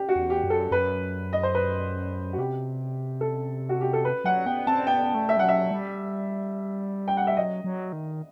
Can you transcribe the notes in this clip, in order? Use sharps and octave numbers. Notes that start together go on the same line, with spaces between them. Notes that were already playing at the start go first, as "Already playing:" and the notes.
Already playing: G4
F#4
E2
G4
F#2
A4
F#2 B4
D#5
C5
B4
F#4
C3 G4
A4
F#4
G4
A4
B4
F#3 F#5
B3 G5
C4 A5
B3 G5
A3
E5
G3
F#3 F#5
E5
G3
G5
F#5
E5
F#3 D#5
F#3
D#3